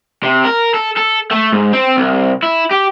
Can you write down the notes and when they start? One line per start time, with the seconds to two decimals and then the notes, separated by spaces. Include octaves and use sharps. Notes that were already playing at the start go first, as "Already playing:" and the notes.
0.23 C3
0.45 A#4
0.74 A4
0.97 A4
1.31 A3
1.52 G#2
1.73 C4
1.97 C2
2.42 E4
2.71 G4